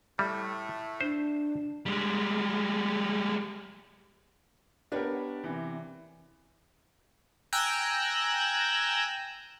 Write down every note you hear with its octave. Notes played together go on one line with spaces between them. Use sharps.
A2 G3 A3
D4 C5
G3 G#3
B3 D4 G4 A#4 B4 C#5
C3 E3
G5 G#5 A#5 E6 F#6